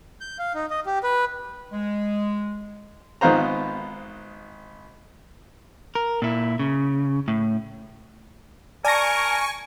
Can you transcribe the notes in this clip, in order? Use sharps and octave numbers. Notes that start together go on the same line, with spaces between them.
G6
F5
D#4
D#5
G4
B4
G#3
G#1 D#3 B3 F4 C5 A#5
A#4
A#2 E4
C#3
A2
A#4 D5 G#5 A5 C#6 A#6